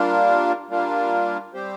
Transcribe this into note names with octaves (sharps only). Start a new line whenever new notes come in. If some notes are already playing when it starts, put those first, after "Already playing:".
Already playing: G3 A#3 D4 F4 A#4
G3 A#3 D4 F4 A#4
G3 C4 G4 C5